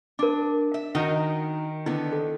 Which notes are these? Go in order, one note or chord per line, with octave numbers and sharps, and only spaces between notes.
D4 A#4 D6
E5
D#3 D#4 F#4 A#4 F#5
D3 B3 E4
A4